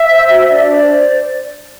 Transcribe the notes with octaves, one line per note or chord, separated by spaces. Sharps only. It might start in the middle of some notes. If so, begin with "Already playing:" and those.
Already playing: E5
C5
F#4
D4 D5
C5